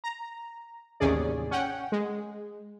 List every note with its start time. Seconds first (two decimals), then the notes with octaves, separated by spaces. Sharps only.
0.04 A#5
1.00 A1 D#2 C3 C#4 G#4 D5
1.51 C#4 F#5 G5
1.92 G#3